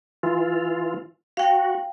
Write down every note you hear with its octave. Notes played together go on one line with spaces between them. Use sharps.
E3 F4
F#4 F5 G5